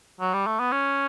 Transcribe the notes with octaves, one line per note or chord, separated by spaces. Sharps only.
F#3
G3
A3
B3
C#4